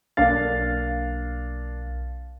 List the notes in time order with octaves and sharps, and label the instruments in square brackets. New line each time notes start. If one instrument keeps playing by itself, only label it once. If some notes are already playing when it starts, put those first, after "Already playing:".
[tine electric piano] B1 A6 [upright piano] A#3 D4 F5